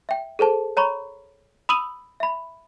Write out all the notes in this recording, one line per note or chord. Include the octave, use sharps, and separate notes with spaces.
E5 G5
G#4 A4 C5 A5
C#5 A#5 B5 C#6
B5 D#6 E6 D#7 F#7
E5 B5